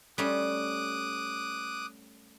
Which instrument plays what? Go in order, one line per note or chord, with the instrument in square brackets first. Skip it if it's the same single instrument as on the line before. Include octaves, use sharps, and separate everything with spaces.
[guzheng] G3 A3 C#4 [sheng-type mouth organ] D6 D#6 F#6